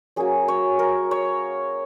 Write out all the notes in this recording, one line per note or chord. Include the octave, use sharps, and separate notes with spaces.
F#3 A#3 C#4 G#4
C#5
A#4
C#5